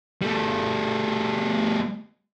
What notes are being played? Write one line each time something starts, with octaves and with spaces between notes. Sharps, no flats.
G3 A3